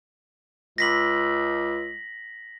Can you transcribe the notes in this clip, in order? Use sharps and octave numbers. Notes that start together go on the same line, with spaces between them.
C#2 A#6 B6 F#7